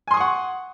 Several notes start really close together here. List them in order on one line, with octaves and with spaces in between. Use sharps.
G#5 C6 D#6 C#6 F#5